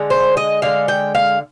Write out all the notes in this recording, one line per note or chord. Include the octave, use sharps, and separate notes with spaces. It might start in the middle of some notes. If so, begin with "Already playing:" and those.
Already playing: D3 G#3
C5
D#5
D3 G#3 F5
G5
F5